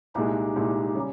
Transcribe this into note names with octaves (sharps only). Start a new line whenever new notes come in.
C2 A#2 G#3 D#4 G4
C2 A#2 G#3
C#3 G3 C#4 G#4